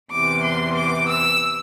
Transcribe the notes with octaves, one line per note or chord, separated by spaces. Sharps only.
E2 C3 E3 D6
C6
D6
E6